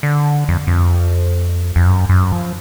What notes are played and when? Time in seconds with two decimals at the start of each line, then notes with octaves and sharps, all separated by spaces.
0.03 D3
0.48 F2
0.67 F2
1.76 F2
1.86 F#2
2.09 F#2
2.32 F3